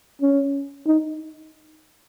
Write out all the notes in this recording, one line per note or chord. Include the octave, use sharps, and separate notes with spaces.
C#4
D#4